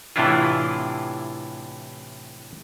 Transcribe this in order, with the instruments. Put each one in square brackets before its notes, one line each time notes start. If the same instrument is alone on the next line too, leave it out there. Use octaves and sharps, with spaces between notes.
[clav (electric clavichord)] A2 C3 E3 D4 E4 F4